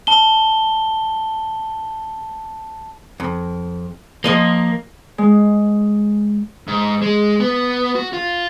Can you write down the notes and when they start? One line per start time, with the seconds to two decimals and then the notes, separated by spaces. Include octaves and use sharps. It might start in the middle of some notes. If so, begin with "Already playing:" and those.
0.07 A5 G7
3.20 F2
4.24 F3 A#3 D#5 C6
5.18 G#3
6.67 G#2
7.02 G#3
7.40 B3
7.96 F#4
8.13 F4